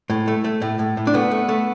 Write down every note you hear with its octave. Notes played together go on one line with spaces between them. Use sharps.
A2
A3
A3
A2
A2
A2
D4
A3 B3
A3
A3